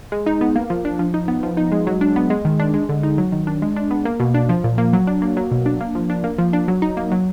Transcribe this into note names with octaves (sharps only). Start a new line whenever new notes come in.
G#3
D#4
B3
A#3
F3
D4
F3
D#4
B3
F3
D#4
G#3
F#3
D4
B3
G#3
D#3
D4
G#3
D3
D#4
F#3
D#3
D4
G#3
D4
B3
A#3
B2
D4
F3
A#2
A#3
F#3
D4
A#3
F#3
B2
D4
A#3
F3
D4
A#3
F3
D4
F#3
D#4
A#3
F#3